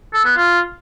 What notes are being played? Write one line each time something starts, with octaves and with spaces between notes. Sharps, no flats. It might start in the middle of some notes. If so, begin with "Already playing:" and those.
A4
B3
F4